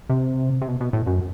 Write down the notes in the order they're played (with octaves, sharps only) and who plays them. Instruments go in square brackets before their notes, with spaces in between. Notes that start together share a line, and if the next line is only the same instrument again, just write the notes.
[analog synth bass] C3
C3
B2
B2
A2
F#2